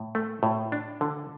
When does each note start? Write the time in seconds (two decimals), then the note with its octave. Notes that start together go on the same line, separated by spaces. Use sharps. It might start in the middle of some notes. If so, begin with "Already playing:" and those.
Already playing: A2
0.15 A3
0.43 A2
0.72 D4
1.01 D3